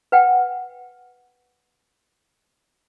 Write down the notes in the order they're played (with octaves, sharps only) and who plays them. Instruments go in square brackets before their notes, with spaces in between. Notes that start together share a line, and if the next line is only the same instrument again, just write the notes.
[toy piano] B4 F#5 G5